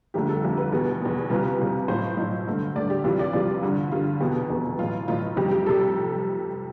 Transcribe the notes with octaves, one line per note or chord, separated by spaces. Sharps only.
G1 F2 D3 A3 G4
A4
G1 F2 D3 A3 G4
B4
E2 B2 G3 B3 G4
E2 B2 G3 B3
C2 C3 F3 B4
C2 C3 F3
B1 A2 F3 C5
B1 A2 F3
G2 D3 A3
G2 D3 A3 D5
G4
F2 C3 E3 G3 F4
D5
F2 C3 E3 G3 F4
G2 D3 G3
G2 D3 G3 F4
F1 E2 B2 B3 G4
F1 E2 B2 B3
B1 A2 E3 F4
B1 A2 E3 F4
F4
G1 F2 C3 G3 G4
G4
C3 G3 A4